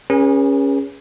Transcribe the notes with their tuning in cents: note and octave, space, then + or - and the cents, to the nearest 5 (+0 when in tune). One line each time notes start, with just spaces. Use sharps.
C#4 +0 G#4 -25 B4 -45